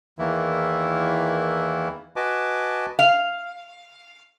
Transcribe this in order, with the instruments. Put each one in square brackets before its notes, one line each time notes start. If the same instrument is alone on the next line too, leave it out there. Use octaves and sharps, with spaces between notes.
[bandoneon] E2 D#3 E3 A#3 E4
F#4 B4 D#5 G#5 A5 D6
[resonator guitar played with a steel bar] F5